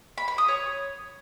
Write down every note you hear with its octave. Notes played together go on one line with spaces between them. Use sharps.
B5
B5
D#6
C#5